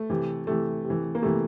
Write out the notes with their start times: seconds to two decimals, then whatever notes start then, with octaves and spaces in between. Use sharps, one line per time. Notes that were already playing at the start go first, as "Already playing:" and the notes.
Already playing: A3
0.10 C3 E3
0.47 C3 E3 A3
0.84 C3
0.90 E3
1.15 A#3
1.22 C3 E3 A3